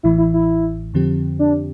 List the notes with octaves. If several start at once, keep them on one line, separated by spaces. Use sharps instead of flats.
A1 A2 E3 E4
E4
E4
F2 D3 F3 C4 G4
D4